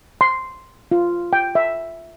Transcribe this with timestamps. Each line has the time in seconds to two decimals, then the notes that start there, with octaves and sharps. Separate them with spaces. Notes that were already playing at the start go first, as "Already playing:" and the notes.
0.21 C6
0.91 F4
1.33 G5
1.55 E5